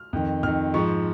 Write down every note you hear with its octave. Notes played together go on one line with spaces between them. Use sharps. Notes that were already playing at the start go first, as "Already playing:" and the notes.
Already playing: F6
F2 D#3
F2 D#3 F6
G#2 F3 C#6